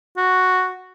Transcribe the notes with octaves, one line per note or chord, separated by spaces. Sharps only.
F#4